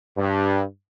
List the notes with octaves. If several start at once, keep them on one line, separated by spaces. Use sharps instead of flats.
G2